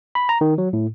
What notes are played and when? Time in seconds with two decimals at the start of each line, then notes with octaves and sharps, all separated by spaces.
0.15 B5
0.29 A#5
0.41 D#3
0.58 F#3
0.73 A2